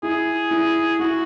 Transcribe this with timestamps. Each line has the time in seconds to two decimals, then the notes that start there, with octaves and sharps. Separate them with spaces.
0.03 E4 G#4
0.51 E4
0.99 E4 F#4